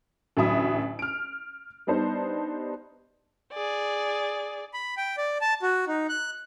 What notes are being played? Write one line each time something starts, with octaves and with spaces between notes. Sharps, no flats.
A1 D2 F#3 E5 B5 D#6
F6 D7
G3 B3 D4 D#4 C5
G#4 D5
B5
G5
D5
A5
F#4
D#4
F#6